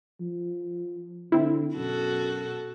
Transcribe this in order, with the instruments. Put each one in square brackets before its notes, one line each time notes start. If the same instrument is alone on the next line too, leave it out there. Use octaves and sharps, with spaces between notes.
[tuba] F3
[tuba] D3 [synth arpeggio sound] C4 E4
[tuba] F#2 [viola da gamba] B2 F#4 A4